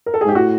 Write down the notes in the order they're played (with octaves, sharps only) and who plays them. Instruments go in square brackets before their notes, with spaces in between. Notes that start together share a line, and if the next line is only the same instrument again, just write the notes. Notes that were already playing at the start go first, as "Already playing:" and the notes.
[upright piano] A#4
A4
G#4
[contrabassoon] G#2 [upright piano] G4
[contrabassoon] A2 [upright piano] F#4